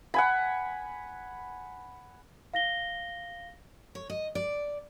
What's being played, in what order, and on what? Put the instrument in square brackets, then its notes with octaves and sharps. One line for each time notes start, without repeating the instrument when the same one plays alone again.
[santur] F#5 G#5 B5
[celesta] F5 A#6 G7
[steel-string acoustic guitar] C#5
D#5
D5